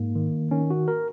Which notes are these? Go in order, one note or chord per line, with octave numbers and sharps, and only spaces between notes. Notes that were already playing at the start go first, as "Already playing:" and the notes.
Already playing: G#2 A#3
D#3
D#3 C#4
F#4
A#4